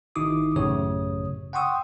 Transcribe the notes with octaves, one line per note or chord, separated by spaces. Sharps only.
G#1 D#3 D#4 E4 D6 D#6
A1 F#2 A2 C#3 C#5 D#6
F#5 G5 C6 C#6 D#6 E6